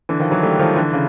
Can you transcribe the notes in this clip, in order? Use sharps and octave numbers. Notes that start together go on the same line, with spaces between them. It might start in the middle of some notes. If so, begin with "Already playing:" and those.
D3 E3
D#3 F3
E3 F#3
G3 A3
D#3 F3
D3 E3
C#3